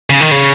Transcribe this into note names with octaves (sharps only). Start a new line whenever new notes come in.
C#3
D#3
C#3